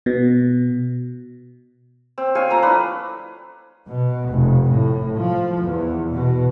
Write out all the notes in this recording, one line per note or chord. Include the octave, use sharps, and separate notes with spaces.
B2
C4
C#5 F5 G#5 C#6
F3 A3 A#5
D4 E4 B4 E6
B2
F1
A2
F3
E2
B2